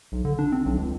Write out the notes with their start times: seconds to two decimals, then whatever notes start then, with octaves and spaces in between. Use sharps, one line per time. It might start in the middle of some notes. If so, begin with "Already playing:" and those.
0.12 B1
0.25 D3
0.39 D4
0.52 C4
0.65 B1
0.78 C#2